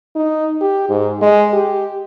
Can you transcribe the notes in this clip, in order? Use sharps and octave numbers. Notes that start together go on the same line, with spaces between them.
D#4
G4
G#2
G#3
G4